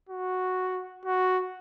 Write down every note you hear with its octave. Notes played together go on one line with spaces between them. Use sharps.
F#4
F#4